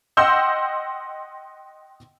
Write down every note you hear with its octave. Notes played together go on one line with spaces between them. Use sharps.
D#5 F#5 G5 C6 E6 G6